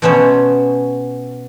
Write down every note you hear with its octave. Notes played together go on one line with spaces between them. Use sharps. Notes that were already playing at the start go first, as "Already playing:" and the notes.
B2 A3 B3 C#4 C5 C#5